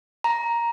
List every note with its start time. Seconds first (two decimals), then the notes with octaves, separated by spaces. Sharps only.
0.24 A#5